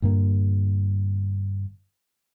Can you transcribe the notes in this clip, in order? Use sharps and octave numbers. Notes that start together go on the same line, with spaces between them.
G1 G2 A#2 A#3